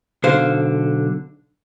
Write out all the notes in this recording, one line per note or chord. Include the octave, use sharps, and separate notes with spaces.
B1 D3 C5 F5